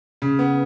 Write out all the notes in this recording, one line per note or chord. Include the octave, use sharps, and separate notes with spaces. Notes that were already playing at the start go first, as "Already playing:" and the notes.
C#3
B3